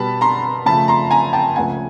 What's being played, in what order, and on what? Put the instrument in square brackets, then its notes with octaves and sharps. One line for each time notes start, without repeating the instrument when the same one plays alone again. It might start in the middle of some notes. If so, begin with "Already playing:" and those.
Already playing: [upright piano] B2 G3 B3 A5 B5
A#5 C6
C#3 F3 A3 A5 B5
A#5 C6
G#5 A#5
G5 A5
C#2 C#3 F3 A3 F#5 G#5